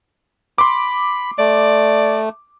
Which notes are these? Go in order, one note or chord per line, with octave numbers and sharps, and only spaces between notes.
B5 C6 D6
A3 D5